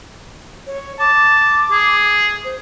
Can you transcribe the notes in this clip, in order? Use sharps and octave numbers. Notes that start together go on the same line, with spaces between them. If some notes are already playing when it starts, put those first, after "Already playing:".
C#5
A5 D6
G#4
C5